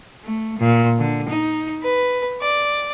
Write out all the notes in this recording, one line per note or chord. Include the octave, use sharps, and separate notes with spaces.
A3
A#2
D3
D#4
B4
D5